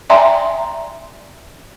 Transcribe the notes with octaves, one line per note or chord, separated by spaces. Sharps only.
D5 E5 G5 G#5 A#5 C6